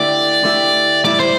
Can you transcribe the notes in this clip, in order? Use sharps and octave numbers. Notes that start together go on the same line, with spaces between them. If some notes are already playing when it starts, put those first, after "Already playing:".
Already playing: D3 A3 E4 G4 D5
D3 A3 E4 G4
A2 G3 E4 D5
C5